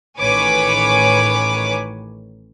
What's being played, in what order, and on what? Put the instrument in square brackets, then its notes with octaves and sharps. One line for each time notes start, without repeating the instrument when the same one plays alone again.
[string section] A1 D#3 B4 C#5 G#5 D6